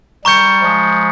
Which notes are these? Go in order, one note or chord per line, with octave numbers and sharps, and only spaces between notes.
G3 A#5 C#6 G6 C#7
F3 G#3